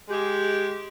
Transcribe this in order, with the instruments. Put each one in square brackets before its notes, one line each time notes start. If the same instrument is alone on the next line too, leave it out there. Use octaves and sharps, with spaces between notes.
[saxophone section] G#3 G4